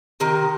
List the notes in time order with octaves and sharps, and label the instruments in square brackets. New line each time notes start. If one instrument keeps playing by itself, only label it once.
[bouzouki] C3 D#3